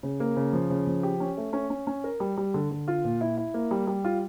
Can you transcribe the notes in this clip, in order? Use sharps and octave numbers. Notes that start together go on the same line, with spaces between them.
C#3
A#3
C#3
F3
C#3
F3
G4
C#4
A3
C#4
C#4
C#4
A#4
G3
G3
D3
D3
F4
A#2
E4
E4
A#3
G3
G3
F4